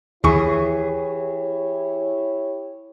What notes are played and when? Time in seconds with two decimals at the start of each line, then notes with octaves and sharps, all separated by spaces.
0.24 D#2 E3 E4 G4 G#4 C#5 C#6